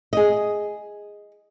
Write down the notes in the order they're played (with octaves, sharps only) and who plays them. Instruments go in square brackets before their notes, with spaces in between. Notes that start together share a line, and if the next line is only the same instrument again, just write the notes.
[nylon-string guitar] G#4 D#5